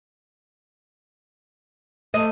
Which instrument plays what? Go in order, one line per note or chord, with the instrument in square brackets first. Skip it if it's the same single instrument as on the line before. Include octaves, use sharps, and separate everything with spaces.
[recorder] A3 [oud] D#5